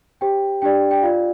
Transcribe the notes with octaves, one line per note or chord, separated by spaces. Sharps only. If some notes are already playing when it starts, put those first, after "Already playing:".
G4 C5 G5
D4 G4 D5 G5
G5
F4 D5 F5